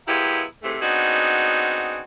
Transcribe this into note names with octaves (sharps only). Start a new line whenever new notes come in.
F#3 G#3 A#3 B3 E4 G4
G#2 C3 E3 A3
B3 C4 D4 D#4 F#4 G#4